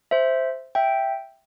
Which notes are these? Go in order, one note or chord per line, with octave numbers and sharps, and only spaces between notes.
C5 E5
E5 G5